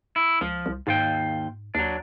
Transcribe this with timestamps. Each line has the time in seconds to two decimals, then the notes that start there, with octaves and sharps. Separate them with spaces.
0.16 E4
0.41 C#2 F3
0.66 C2
0.87 D#2 G#2 F4 G5
1.75 D#2 F#3 D4